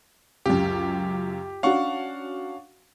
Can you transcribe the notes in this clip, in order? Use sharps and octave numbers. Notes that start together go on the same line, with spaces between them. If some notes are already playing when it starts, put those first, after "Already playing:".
C#2 F#2 G4
C#4 D4 F#4 F5 F#5 C#6